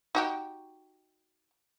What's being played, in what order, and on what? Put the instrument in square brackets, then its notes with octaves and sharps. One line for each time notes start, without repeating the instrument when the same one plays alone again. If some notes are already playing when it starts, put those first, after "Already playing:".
[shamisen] D#4 F#4 G4